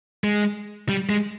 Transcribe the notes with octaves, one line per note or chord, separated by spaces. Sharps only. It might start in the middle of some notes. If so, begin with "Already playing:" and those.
G#3
G3
G#3